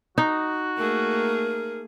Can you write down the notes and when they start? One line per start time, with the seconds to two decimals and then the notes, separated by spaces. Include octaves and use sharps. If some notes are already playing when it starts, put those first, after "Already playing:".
0.18 D#4 F#4
0.77 A3 A#3 G#4 A#4